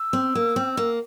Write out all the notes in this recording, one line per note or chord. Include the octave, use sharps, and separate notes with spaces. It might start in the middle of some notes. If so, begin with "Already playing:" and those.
Already playing: E6
C4
A#3
C4
A#3